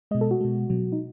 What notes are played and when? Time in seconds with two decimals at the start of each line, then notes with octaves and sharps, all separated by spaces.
0.11 B2 G#3 D#5
0.21 A4
0.31 F#4
0.41 B2 G#3
0.70 B2 F#3
0.92 D#4